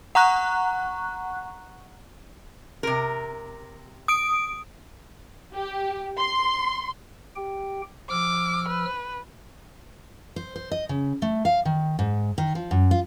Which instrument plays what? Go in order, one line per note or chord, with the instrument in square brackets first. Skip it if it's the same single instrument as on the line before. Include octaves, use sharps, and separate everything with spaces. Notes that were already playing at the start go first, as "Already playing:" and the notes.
[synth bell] F#5 A#5 C#6 F#6
[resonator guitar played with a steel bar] C3 A#4
[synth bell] D#6 D7
[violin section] G4
C6
[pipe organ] G4 G5
[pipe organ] F3 E6 F6 [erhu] D6
[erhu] B4
[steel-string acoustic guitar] C5
C5
D#5
C#3
A3
F5
D#3
G#2
D#3
F3
F#2
F4